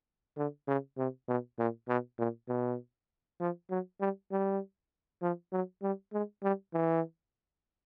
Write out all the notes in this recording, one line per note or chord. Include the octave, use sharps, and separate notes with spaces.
D3
C#3
C3
B2
A#2
B2
A#2
B2
F3
F#3
G3
G3
F3
F#3
G3
G#3
G3
E3